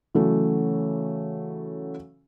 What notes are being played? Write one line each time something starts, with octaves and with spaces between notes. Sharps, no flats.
C#3 E3 F#3 A3